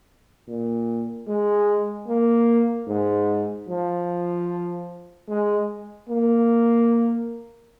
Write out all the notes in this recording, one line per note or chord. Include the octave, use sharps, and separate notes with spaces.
A#2
G#3
A#3
G#2
F3
G#3
A#3